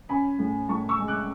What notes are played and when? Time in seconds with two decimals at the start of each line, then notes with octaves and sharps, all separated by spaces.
0.09 C#4 G#5 B5
0.39 A2
0.68 A2 A5 C#6
0.89 C#6 E6
0.98 G#3
1.08 D6 F#6